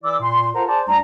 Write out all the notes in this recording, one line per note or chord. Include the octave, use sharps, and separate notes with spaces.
E3 E4 D5 D6 E6
A#2 C6
F4 A4 A#4 C5 F#5 A#5
G#4 C5 D5 A5
D2 G3 D4 A#5